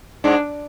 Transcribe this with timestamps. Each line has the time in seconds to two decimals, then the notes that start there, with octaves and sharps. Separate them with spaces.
0.24 G#2 G#3 D4